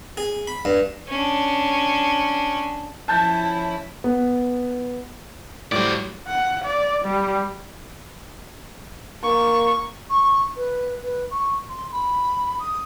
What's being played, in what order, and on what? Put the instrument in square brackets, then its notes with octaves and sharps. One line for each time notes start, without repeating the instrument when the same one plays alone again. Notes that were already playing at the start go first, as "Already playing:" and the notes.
[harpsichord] G#4
B5
G2
[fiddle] C#4 D4
[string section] F3 C#4 E4 [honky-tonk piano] A5 G6 A6
[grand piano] B3
[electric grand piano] A2 F#3 G3 [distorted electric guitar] C5 D5
[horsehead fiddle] F#5
D5
G3
[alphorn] A#3 [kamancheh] C#6
[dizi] C#6
B4
B4
C#6
C6
B5
D#6